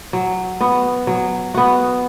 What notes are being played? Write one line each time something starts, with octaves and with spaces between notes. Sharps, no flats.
F#3
B3 F#4
F#3
B3 F#4